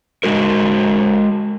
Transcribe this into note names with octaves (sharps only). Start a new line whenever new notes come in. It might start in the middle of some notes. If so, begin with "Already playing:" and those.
G#3 F#4 A#4